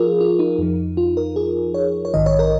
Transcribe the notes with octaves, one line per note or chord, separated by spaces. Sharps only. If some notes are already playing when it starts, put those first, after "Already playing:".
Already playing: F3 F4 G#4 A#4
F4
D#4
F2 F3
F4
A#4
G#4
C#5
C#5
A#1 G#2 D#3 D#5
C#5
A#4